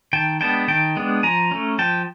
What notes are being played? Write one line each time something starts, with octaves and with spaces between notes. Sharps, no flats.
D#3 G5 A5
G#3 B3 D4 G5 A5
D#3 G5 A5
G#3 B3 D4
F3 G#5 A#5
A3 C#4
F3 G5 A5